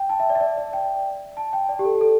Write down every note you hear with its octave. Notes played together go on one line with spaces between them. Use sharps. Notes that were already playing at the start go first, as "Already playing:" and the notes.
Already playing: G5
A5
E5
D5
E5
D5
D5
G5
A5
G5
D5
G4
A4
A4